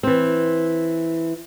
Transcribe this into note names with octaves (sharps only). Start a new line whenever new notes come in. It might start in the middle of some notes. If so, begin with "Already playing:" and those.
E3 C4